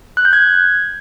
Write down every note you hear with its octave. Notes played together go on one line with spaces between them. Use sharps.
F#6
G6
G#6